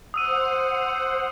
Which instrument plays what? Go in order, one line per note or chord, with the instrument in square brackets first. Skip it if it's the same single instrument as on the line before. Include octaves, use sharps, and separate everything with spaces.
[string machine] C5 F#5 [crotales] D#6 E6 D#7